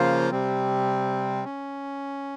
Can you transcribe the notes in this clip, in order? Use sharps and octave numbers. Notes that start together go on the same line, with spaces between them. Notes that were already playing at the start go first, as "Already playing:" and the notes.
Already playing: C#3 F3 A#3 F4 C5
C3 G3 C4
C#4